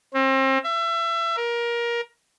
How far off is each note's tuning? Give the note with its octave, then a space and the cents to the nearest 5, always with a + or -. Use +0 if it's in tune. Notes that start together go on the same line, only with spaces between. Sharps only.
C4 +35
E5 +30
A#4 +20